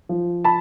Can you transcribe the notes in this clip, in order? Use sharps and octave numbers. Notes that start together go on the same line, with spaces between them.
F3
A5 B5